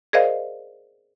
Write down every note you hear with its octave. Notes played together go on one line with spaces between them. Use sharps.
G#4 A#4 C5 D5 D#5 F5